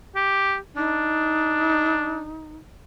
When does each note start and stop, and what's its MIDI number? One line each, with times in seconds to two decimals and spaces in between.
0.16 0.57 67
0.76 2.32 62
0.76 2.56 63